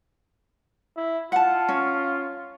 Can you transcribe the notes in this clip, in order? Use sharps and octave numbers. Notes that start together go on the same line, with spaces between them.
E4
F4 F#5 A5
C#4